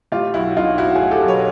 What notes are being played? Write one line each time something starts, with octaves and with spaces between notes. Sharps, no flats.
A2 F4 G4
B1 E4 F#4
B1 D#4 F4
F#3 E4 F#4
F#4 G#4
A2
G4 A4
B1
B4 C#5